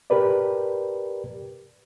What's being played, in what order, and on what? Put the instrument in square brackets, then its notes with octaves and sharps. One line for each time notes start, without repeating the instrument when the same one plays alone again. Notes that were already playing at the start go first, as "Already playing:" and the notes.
[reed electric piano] G4 A#4 B4 D5